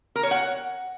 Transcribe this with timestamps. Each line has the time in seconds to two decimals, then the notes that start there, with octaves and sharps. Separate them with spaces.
0.16 A#4
0.23 C#5
0.31 F#5